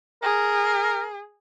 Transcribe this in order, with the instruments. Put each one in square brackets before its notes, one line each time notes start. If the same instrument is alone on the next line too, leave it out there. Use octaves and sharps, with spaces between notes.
[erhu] G#4 [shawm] A#4